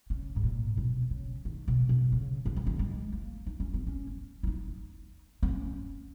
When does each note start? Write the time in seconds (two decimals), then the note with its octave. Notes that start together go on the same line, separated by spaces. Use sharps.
0.10 C#3
0.36 G#2
0.43 A#2
0.77 B2
1.11 C#3
1.45 D#3
1.68 B2
1.89 B2
2.12 C#3
2.46 D#3
2.56 E3
2.67 D#3
2.79 G#3
3.13 A#3
3.47 D#4
3.60 C#4
3.74 B3
3.87 C#4
4.43 E4
4.47 D#4
5.43 B3
5.48 C#4